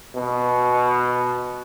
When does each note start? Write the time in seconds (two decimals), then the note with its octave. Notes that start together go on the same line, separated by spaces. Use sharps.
0.15 B2